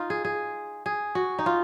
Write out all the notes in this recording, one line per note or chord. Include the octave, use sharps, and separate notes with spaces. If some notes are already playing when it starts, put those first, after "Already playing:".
Already playing: D#4 F4
G#4
G#4
G#4
F#4
D#4
F4